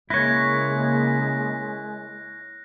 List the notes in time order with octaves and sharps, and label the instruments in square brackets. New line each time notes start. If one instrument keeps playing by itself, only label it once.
[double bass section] C#3 A#3 [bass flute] G#3 [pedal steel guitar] E4 C#5 [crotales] F#6 A#6